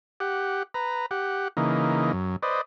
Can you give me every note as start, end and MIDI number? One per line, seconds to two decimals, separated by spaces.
0.20 0.63 67
0.20 0.63 78
0.74 1.06 71
0.74 1.06 82
1.11 1.48 67
1.11 1.48 78
1.57 2.12 49
1.57 2.12 52
1.57 2.12 58
1.57 2.12 63
2.13 2.36 42
2.43 2.61 71
2.43 2.61 72
2.43 2.61 74
2.43 2.61 75